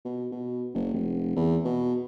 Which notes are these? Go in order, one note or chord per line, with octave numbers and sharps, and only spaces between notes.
B2
B2
F#1
F1
E2
B2